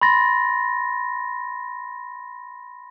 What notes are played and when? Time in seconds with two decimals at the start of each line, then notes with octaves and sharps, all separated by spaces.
0.01 B5 C6 A6 A#6